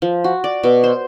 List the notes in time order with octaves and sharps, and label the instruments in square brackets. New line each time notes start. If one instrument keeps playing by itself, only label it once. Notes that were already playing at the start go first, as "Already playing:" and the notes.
[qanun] F3
F#4
D5
B2
C5